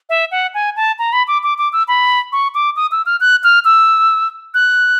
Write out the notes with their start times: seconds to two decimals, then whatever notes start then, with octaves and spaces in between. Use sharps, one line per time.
0.09 E5
0.31 F#5
0.54 G#5
0.76 A5
0.99 A#5
1.13 B5
1.28 D6
1.43 D6
1.58 D6
1.73 E6
1.88 B5
2.32 C#6
2.55 D6
2.76 D#6
2.92 E6
3.06 F6
3.21 F#6
3.44 F6
3.65 E6
4.54 F#6